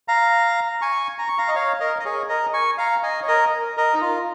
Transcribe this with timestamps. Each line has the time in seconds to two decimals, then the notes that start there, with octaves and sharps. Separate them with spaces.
0.08 F5 A#5
0.81 G#5 C#6
1.19 A#5
1.28 C#6
1.38 F5 A#5
1.48 D#5
1.55 C#5 F5
1.80 A#4 D#5
1.99 D#5
2.05 G#4 C#5
2.29 A#4 D#5
2.53 G#5 C#6
2.78 F5 A#5
3.03 D#5 G#5
3.23 C#5
3.28 A#4 D#5
3.77 A#4 D#5
3.94 D#4
4.01 F4